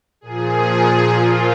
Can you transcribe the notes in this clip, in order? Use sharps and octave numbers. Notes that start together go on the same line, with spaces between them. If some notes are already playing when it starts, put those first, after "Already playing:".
A#2 F3 G#4
A#2 F3 F4